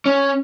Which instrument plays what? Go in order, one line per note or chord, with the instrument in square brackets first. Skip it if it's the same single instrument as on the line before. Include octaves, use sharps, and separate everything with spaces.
[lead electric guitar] C#4